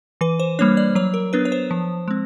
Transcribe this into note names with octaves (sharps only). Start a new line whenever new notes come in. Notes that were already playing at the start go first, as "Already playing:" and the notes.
E3 B4
C5
G3 A#3 D4 C#5
D5
F#3 C#5
A#4
B3 D4 B4
C#5
C5
F3
G#3 C4